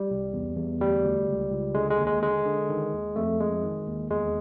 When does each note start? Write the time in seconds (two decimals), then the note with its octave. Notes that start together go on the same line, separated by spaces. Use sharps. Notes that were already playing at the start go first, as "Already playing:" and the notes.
Already playing: G3
0.11 C2
0.33 E2
0.57 E2
0.80 D2 G3
1.04 D2
1.27 C#2
1.51 C#2
1.74 D3 G#3
1.91 G#3
1.98 D#2
2.07 G#3
2.22 D3 G#3
2.45 D3
2.69 D#3
2.93 D#2
3.16 F2 A3
3.40 F2 G#3
3.63 D#3
3.88 D#2
4.10 E2 G#3